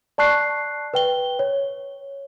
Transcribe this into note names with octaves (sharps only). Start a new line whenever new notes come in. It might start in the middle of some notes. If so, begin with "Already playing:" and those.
D5 A5 C#6 F#6 C7
B4 G5 G7
C#5